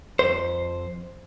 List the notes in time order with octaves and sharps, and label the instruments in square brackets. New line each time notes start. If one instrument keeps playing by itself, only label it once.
[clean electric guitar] F2 C5